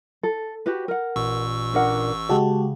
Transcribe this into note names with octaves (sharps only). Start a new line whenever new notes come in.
A4
F#4 G4 B4
A#4 F#5
A1 A#2 C#6 E6
D4 A#4 F#5
C#3 G#3 F#4 G4 A5